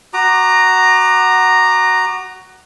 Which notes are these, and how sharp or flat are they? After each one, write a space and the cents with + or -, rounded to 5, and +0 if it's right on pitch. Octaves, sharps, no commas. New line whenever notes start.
F#4 +10 A#5 +0 D6 +40